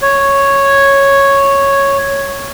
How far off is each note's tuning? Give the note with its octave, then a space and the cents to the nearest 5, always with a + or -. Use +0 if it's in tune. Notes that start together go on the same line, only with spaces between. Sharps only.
C#5 -5